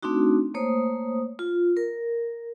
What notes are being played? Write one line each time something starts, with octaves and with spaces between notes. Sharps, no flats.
A3 C4 D4 D#4 F#4
A3 A#3 C5 C#5 D#6
F4
A#4